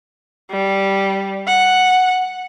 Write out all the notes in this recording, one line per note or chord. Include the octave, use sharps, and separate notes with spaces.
G3
F#5